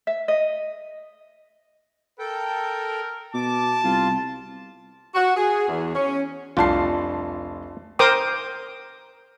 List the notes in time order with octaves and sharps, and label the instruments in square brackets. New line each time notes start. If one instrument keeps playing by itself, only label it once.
[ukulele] E5
D#5
[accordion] A4 G5 [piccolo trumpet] A#4
[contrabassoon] B2 [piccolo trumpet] A5 [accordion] D6
[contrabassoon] C2 [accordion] F4
[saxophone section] F#4
G#4
E2
C#4
[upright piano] F1 A5 C7 [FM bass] C2 [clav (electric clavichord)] D4 F4
[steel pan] A#4 C5 G5 D6 D#6